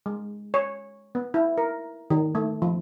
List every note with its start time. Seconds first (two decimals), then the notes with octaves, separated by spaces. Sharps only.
0.06 G#3
0.54 C#5
1.15 B3
1.34 E4
1.58 A#4
2.10 D#3
2.35 A3
2.62 F3